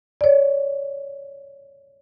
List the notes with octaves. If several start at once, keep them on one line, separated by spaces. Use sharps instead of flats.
C#5 D5